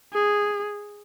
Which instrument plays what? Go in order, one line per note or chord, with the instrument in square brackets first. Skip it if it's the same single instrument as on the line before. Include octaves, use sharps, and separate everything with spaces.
[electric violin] G#4